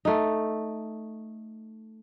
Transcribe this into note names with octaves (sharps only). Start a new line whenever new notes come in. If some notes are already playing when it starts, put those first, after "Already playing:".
A3 D#4